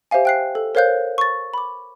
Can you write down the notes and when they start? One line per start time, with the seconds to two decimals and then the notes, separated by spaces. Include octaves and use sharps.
0.11 G4 C5 E5 F5 G#5
0.25 G5 F#6 C7
0.55 A4
0.75 A#4 C5 C#5 F5 F#6 G6
1.18 C#6 A6
1.54 B5 D6